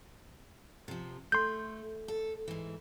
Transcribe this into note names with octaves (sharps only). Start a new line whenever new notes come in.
C3 F3
A3 C6 G6
A4
G#2 E3